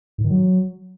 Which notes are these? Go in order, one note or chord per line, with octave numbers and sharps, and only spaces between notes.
G#2
D#3
F#3